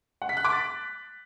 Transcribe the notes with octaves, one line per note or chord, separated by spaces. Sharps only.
F#5
B6
F#6
D6
A6